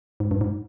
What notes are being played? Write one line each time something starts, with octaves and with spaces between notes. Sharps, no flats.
G#2
G2
G#2